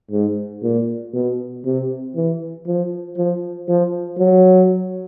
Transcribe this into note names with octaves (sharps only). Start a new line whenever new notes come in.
G#2
A#2
B2
C3
E3
F3
F3
F3
F#3